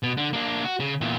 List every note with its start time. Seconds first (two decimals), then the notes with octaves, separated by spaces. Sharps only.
0.03 B2
0.17 D3
0.33 A#3 D4
0.64 F#4
0.80 C#3
1.01 E2 A#2